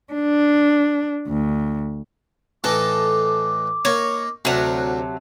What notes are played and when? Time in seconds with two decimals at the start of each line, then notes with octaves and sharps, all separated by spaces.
0.13 D4
1.28 D2
2.64 A2 E3 D#4 A4 D6
3.85 A#3 D#4 C#5
4.45 D2 C3 F#3 D4 A5